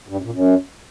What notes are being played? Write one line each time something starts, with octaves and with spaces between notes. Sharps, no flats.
G2
F#2
A#2
F#2